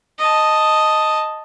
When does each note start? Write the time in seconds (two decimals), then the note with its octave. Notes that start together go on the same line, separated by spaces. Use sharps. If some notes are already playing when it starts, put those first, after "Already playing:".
0.19 D#5 A5